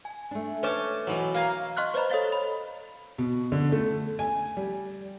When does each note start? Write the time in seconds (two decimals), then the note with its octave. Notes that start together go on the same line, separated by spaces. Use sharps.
0.05 G#5
0.31 A3 D4
0.63 C#4 B4 C#5 A5 D6
1.07 B2 E3 F#3
1.34 A#3 F5 G#5 A#5 C6
1.77 D#5 F5 C6 C#6 F6 F#6
1.94 B4 C5 D5 D#5 A#5 B5
2.10 A4 C#5 D#5 F5 A6 G7
2.32 B5
3.18 B2
3.52 D3
3.72 A3
4.19 G#5
4.57 G3